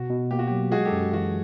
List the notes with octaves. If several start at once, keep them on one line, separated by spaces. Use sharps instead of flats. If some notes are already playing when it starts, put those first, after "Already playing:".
Already playing: B2 F#4
B2
A#3 G4
F#4
F#3 G4
G#3 F#4 G#4
G4 A4
F#2
E3 F#4